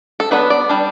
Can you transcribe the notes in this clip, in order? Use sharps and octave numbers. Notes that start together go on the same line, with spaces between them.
A4
F#3 B3 D4 B4
D5
G3 D4